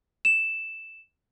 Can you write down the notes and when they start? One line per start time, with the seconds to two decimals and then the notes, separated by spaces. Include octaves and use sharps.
0.25 E7